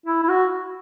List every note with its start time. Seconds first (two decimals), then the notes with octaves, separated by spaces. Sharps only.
0.06 E4
0.23 E4
0.29 F#4